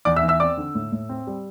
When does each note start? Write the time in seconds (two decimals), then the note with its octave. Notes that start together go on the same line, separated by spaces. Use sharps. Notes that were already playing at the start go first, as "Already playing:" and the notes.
0.05 E2 D5 D6
0.16 E5 E6
0.23 E2
0.28 E5 E6
0.40 C4 D5 D6
0.57 D3
0.75 A2
0.92 A2
1.09 C4
1.27 G3